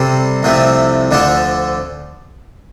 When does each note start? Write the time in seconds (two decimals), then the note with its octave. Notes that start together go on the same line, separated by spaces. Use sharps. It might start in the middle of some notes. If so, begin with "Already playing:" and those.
Already playing: C3 G3 C4 A4
0.43 C2 C3 F3 A3
1.11 D2 D3 F3 D4 A4